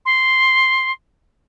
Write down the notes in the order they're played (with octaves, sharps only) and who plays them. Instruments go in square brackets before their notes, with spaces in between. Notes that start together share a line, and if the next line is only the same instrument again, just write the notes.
[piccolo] C6